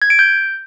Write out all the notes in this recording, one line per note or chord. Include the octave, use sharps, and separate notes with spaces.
G#6
D7
G6